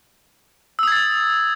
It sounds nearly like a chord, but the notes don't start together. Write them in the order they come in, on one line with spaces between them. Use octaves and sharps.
E6 D#6 G#6 A6